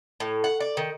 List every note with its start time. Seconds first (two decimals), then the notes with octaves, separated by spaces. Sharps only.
0.20 A2
0.44 F#5
0.60 D5
0.77 D#3